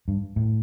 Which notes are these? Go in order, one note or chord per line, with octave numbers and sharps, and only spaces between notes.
G2
A2